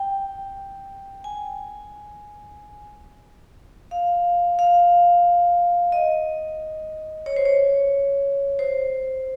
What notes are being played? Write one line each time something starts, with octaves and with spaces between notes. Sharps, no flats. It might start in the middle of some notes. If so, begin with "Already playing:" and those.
Already playing: G5
G#5
F5
F5
D#5
C#5
C5
C#5
C5